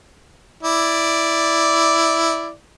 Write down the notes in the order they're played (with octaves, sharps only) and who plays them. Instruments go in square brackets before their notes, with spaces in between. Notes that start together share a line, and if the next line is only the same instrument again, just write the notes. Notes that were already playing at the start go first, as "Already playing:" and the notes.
[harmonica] E4 D5